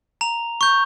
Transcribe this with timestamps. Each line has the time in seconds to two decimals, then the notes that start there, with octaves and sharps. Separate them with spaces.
0.21 A#5 F7
0.61 C#6 G6